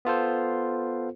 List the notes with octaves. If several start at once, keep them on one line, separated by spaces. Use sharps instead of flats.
B3 F4 A4 C5